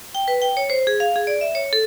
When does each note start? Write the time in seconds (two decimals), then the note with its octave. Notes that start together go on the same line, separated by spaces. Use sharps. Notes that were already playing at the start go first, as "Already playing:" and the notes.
0.15 G5
0.28 B4
0.42 G5
0.57 C#5
0.70 C5
0.87 G#4
1.00 F5
1.16 G#4
1.27 D5
1.41 E5
1.55 C#5
1.73 A4